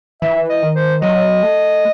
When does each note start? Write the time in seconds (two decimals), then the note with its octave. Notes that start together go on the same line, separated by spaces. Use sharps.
0.22 E3 E5
0.49 D#5
0.62 D#3
0.76 C5
1.02 F#3 D#5
1.43 A3